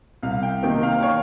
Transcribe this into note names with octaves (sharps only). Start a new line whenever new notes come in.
C2 F5
G5
C3 D#3 A#3 G5
F5
C#5